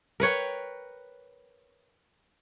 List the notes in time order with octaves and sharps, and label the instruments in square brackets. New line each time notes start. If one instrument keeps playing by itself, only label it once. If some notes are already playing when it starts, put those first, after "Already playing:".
[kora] A#4 B4 C#5 G5